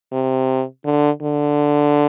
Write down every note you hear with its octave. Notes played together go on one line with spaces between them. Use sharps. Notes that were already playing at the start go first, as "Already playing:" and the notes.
C3
D3
D3